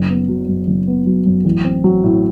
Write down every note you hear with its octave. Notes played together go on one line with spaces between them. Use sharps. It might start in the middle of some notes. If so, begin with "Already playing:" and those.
Already playing: F#1
B3
F#3
F#2
F#1
B3
F#3
F#2
A1
C4
F#3
A2